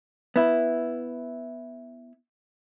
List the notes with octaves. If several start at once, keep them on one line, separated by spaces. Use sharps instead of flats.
B3 E4